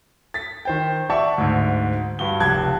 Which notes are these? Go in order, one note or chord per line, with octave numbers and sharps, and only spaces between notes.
A6 B6
D#3 C5 G5
D5 E5 F#5 A5 C#6
D2 G#2
G2 F#4 G7
F1 C#2 G4 A5 F#6 G#6